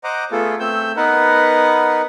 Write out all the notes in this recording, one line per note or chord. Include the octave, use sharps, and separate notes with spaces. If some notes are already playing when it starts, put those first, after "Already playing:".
C5 D#5 F#5 A#5 D6
A3 B3 F4 G#4 A4
A3 C4 E6 G6
B3 D#4 A#4 B4 F#5